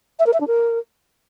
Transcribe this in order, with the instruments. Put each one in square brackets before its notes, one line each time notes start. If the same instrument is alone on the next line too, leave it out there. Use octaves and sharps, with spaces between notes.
[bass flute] E5
A#4
E5
D4
A#4